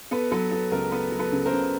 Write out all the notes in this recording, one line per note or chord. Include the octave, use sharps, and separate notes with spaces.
B3 A4 B4
F#3 A4 B4
B3 A4
C#2 A#4
B3 A4 B4
F#3
A4 B4
C#3
A#4 C5
C#3